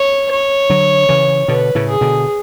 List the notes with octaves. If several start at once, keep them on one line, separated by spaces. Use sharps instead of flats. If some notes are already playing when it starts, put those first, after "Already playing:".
Already playing: C#5
C#5
D3 F#3
C#3 E3
B2 D3 B4
A2 C#3
G#4
B2 D3